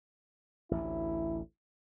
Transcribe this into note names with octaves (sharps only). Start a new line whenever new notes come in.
A1 D2 E4